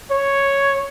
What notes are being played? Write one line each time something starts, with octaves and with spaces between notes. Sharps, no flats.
C#5